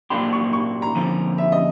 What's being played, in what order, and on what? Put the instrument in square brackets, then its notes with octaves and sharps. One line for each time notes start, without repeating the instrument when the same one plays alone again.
[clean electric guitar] A#2 F#3 A#3 D4 G4 [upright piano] C6
[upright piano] C#6
C#6
A#5
[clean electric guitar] F2 D3 F3 A#3 C#4
[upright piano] E5
D#5